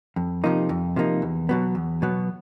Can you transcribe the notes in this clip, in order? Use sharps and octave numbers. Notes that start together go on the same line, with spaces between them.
F2
C3 F3 A#3 D#4
F2
C3 F3 A#3 D#4
E2
B2 F#3 B3
E2
B2 F#3 B3